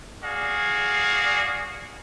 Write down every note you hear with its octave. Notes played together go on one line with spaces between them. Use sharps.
F#4 G#4 D5 F5